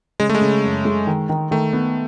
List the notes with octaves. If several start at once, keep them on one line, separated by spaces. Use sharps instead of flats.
C#3 G#3
A3
G#3
C#3
F#2
G#3
D#3
D#3
D#3 A3
B3